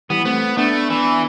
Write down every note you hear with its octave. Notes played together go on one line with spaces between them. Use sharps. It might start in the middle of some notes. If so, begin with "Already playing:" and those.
E3 G3 B3
A3 B3 C4
A3 B3 D4
E3